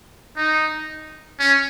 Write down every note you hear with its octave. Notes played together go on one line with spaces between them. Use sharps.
D#4
C#4